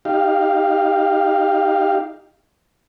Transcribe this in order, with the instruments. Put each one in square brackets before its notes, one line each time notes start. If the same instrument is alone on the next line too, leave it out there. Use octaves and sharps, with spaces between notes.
[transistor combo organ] D#4 G4 F5